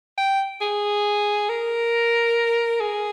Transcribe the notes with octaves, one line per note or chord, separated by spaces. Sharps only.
G5
G#4
A#4
G#4